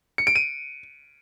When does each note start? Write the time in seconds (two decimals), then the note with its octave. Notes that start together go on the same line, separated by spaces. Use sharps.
0.18 C#7
0.27 D7
0.36 D#7